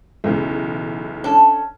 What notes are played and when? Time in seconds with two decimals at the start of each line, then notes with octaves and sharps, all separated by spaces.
0.24 B1 E2 C#3
1.24 C#4 D4 A4